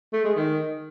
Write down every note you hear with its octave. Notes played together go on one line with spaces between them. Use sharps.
A3
G#3
D#3